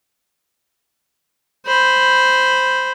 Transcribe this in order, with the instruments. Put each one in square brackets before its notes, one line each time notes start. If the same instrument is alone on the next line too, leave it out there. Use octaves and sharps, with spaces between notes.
[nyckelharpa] C5 B5